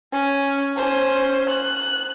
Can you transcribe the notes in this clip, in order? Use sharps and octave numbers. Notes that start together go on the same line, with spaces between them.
C#4
C#4 C5
F#6